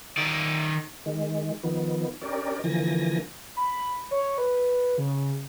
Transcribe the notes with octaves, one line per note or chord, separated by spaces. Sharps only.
D#3 D5
D#3 G#3
D#3 F3 B3
C#4 D4 G4 A#4 D5
D3 E3 F3 A#3 G#5 A#6
B5
C#5
B4
C#3